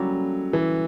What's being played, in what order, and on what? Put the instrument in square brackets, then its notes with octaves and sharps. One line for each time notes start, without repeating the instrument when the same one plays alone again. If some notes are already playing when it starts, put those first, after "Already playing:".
Already playing: [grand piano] F#3 [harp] G3 A#3 C#4 E4 A4
[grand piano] E3